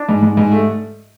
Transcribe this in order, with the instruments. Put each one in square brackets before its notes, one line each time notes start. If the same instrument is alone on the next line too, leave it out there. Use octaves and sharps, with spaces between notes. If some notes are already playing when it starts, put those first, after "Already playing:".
Already playing: [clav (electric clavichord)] D4
[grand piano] G#2
G#2
G#2
A3